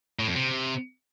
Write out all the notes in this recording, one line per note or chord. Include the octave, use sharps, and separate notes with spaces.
A2
F2
C3